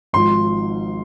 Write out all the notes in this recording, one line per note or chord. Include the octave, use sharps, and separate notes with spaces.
G#1 G#2 F3 C6